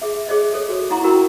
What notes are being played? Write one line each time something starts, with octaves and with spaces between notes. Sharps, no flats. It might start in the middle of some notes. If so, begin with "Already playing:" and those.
G#4 E5
G#4 C#5 D#5 E5
A4 C#5
F#4 C#5
D#4 E4 F#5 A#5 C6 C#6
E4 F#4 A#4 G5 B5 C#6